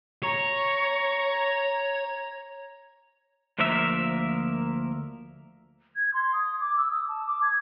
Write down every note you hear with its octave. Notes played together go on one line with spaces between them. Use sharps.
C#5 A#5
D2 F3 A#3 A#4 E5
G#6
C6
D#6
D6
E6
D#6
A5
D6
G#6